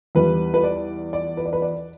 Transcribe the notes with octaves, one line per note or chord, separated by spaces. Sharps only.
E2 E3 G3 B4
B4
D5
D5
B4
D5
B4
D5